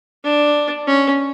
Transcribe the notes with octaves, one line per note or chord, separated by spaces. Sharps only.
D4
C#4